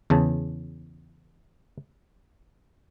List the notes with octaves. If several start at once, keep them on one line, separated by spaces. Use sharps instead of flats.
E2 C#3 A5